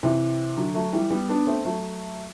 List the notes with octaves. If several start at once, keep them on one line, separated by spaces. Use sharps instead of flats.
C3 E3
D3 F#3
F#3 A3
E3 G3
G3 B3
B3 D4
A3 C4
F#3 A3